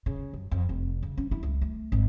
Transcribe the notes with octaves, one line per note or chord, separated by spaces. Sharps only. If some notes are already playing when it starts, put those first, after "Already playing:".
C#3
F#2
F2
F1
C#3
C#4
E4
C#2
A3
G#1